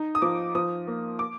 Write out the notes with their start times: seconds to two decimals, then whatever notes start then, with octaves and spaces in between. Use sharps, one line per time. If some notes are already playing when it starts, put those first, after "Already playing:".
Already playing: D#4
0.15 D#6
0.22 F3 D6
0.55 F3 D#6
0.87 A#3
1.19 D6